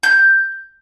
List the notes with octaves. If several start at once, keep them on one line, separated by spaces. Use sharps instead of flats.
G6